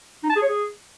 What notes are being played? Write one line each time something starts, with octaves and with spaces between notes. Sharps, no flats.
D#4
A5
G#4
C#5
G#4